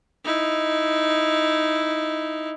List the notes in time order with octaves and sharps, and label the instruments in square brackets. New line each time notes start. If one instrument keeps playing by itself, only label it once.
[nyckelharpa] D#4 E4